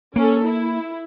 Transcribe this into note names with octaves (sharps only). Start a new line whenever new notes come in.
A#3 C#4 A4
E4